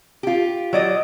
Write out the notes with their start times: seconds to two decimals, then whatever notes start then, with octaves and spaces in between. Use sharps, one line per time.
0.23 F4 G4
0.73 F#3 D5 D#5